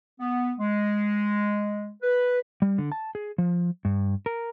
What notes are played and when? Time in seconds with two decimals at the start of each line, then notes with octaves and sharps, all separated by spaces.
0.20 B3
0.59 G#3
2.02 B4
2.62 G3
2.78 D3
2.92 A5
3.15 G#4
3.38 F3
3.85 G2
4.26 A#4